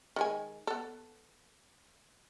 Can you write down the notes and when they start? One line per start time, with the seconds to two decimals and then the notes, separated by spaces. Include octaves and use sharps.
0.16 D#3 G#3 G#5
0.67 B3 A4